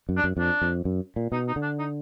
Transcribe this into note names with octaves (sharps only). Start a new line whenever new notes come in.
F#2
D4
F#2
F2 D4
F2
F#2
A#2
B2 D#4
D#4
D3
D4
D#4